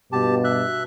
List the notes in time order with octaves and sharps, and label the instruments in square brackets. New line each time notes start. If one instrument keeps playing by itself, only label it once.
[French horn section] G2 B2 [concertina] G4 A5
[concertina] E5 F#6